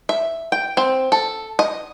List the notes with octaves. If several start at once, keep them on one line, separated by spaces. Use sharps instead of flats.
E5
G5
C4
A4
D#5